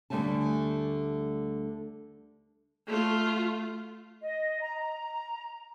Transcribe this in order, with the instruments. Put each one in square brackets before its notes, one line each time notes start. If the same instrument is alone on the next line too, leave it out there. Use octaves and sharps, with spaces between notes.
[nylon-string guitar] D2 D3 G3 A3 G#5 A5
[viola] A3 F4
[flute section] D#5
A#5
A#5